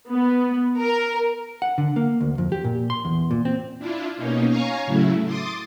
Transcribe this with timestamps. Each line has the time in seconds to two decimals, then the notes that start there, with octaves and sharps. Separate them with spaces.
0.12 B3
0.79 A#4
1.62 F#5
1.78 D3
1.96 A#3
2.21 D2
2.38 F2
2.52 G4
2.64 A#2
2.90 C6
3.05 E2
3.31 A#2
3.45 C4
3.79 D4 E4 F4
4.17 B2 A#3 C#4 D#4
4.49 C#5 F5 G#5 A#5 C#6
4.85 A2 C#3 F#3 A3 E4
5.25 C6 D6 D#6 A6